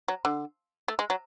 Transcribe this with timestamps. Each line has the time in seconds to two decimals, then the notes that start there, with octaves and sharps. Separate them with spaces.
0.08 F#3
0.25 D3
0.88 A3
0.99 G#3
1.10 F#3